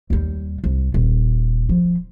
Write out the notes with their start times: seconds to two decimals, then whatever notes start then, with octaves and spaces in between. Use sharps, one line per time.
0.10 D#2 G3
0.64 C2
0.94 D#1
1.69 F3